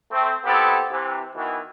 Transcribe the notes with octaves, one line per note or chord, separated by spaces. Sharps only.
A3 C4
B3 C4 E4 G4 A4
C3 E3
B2 D#3 E3